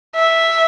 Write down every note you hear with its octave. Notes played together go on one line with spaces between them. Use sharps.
E5